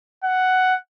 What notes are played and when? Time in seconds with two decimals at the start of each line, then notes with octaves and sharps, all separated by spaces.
0.24 F#5